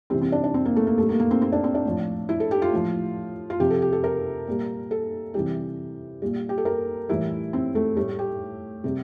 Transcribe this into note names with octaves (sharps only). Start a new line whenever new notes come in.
C3 E3 G3 C4
C4
D4
D4
C4
A#3
A3
A#3
A#2 G3 A3
A#3
A#3
C4
C4
D4
C4
D4
A2 F3
E4
A4
G4
F4
A2 F3
F4
C3 F3 G4
A4
G4
A4
A#4
A#2 G3
A4
C3 E3 G3 G4
A#2 G3
G4
A4
A#4
A2 E3 G3 E4
C4
A3
A2 G3 A3
G4
C3 G3